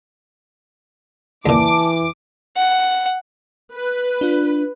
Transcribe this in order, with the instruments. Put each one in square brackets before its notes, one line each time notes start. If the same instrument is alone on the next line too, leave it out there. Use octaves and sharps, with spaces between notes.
[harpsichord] C#2 A#2 [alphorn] E3 [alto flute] A5 [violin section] D6
[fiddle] F#5
[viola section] B4
[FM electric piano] D4 F4